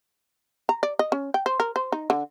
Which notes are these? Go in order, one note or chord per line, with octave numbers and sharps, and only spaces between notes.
A#5
D5
D#5
C#4
G5
C5
A#4
C5
D#4
D3